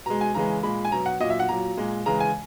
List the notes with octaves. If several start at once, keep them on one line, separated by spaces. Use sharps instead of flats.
B2 G#3 A#5
G#5
C#3 E3 G#3 A#5
A#2 G#3 B5
G#5
B2 F#3 A#5
F#5
A#2 F#3 D#5
E5
F#5
A#2 F#3 A#5
A#2 G#3
C#3 E3 G#3 A#5
G#5